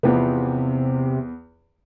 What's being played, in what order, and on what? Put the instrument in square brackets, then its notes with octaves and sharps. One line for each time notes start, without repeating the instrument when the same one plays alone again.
[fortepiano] E2 F3 B3 [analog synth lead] C3